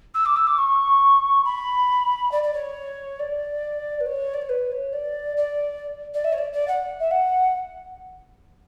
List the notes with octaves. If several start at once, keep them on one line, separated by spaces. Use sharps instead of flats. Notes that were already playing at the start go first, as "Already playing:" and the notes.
E6
D6
E6
D6
C#6
B5
D5
D5
C#5
D5
B4
C#5
D5
C#5
B4
C#5
D5
D5
D5
E5
C#5
D5
D5
F#5
E5
F#5